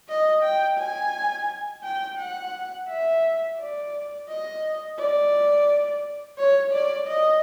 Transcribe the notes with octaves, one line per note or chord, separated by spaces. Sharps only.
D#5
G5
G#5
G5
F#5
E5
D5
D#5
D5
C#5
D5
D#5